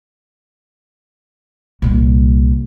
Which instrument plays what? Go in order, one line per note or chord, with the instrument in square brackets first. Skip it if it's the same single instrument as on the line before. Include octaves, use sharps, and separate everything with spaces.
[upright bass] C2 A#2